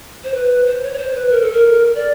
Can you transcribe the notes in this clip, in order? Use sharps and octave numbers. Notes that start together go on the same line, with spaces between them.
C5
B4
C5
C#5
C#5
C5
B4
A#4
A4
A#4
D5